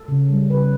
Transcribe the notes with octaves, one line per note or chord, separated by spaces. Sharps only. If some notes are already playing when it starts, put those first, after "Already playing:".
Already playing: A4
C#3
G3
C#3 B4